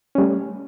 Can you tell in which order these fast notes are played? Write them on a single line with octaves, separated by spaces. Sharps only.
C#4 G3 A3